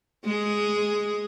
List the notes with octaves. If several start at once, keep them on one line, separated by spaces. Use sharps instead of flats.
G#3 G#4